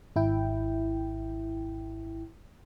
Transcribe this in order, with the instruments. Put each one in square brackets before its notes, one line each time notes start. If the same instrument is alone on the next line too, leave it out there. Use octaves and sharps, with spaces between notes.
[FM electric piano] G#1 E4 G5